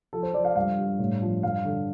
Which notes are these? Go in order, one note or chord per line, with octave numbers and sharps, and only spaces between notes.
F3 A4
C5
F3 D5
F5
G2 F5
G2
A2
F3
G2 F5
D3